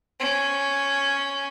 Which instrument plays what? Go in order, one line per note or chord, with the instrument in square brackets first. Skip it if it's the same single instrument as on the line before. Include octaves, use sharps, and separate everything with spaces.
[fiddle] C#4